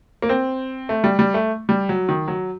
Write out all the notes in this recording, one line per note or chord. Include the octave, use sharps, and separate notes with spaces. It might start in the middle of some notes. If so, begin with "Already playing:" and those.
A#3
C4
A3
G3
G3
A3
G3
F#3
D#3
F#3